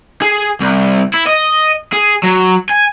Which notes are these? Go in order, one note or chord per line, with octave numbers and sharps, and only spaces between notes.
G#4
C2
E4
D#5
G#4
F#3
G#5